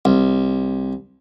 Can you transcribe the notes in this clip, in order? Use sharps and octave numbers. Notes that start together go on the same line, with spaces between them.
C2